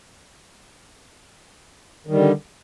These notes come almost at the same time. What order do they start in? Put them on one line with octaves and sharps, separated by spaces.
D#3 G3 D3